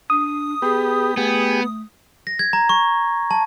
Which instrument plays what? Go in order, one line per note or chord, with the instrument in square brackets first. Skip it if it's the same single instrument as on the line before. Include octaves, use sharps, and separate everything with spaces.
[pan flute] D4 [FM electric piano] D#6
[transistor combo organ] B3 G4 [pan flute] G#4
[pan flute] A3 [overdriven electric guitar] B3 [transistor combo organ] G4 G#4
[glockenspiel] A#6
G#6
A#5
C#6
A5